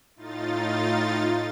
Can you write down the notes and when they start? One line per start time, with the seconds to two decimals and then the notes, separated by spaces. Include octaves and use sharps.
0.16 A2 D#4 F4 A6